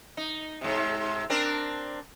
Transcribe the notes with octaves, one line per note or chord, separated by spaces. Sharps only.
D#4
G#2 C3
C4 D4 A#4